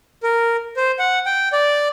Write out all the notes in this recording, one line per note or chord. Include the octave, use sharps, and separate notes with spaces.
A#4
C5
F#5
G5
D5